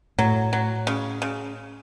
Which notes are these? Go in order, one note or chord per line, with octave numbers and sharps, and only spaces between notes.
A2 F#3
F#3
C#3
C#3